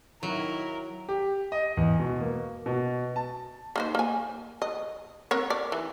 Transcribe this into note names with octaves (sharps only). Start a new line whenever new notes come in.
D#3 F#3 E4 A#4
G4
D#5
E2
B2
A#3
B2
A5
A#3 D#4 C5
A#3 G#5
D#5
C4 A#4 C#5
D5
E3